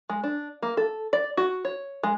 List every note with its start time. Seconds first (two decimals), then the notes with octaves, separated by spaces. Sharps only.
0.10 G#3
0.24 D4
0.62 A#3
0.77 A4
1.13 D5
1.37 F#4
1.65 C#5
2.03 G#3